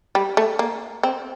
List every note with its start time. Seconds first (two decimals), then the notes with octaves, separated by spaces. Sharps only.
0.15 G3
0.37 A3
0.59 A#3
1.03 C4